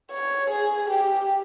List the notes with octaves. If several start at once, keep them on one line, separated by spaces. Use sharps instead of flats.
C#5
G#4
G4